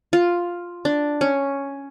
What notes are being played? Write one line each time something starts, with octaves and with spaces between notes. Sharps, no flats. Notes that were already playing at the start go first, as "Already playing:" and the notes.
F4
D4
C#4